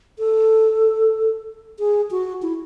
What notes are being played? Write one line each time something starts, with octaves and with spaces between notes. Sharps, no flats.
A4
G#4
F#4
E4